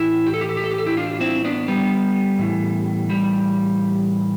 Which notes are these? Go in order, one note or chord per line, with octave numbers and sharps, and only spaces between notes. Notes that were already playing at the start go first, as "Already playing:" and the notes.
Already playing: A2 E3 E4
G4
A4
G4
A4
G4
A4
G4
A4
E4 G4
D4 F4
C4 E4
B3 D4
G3 B3
A2 E3
G3